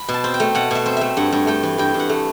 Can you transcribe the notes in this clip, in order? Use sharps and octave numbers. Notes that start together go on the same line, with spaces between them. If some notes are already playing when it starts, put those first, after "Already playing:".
Already playing: B5
B2
A5
C4
G5
A3
B2 F#5
B2 E5
C4
A3 E5
G2 F#5
G2
A3 G5
E3
G2 G5
G2
F#5
A3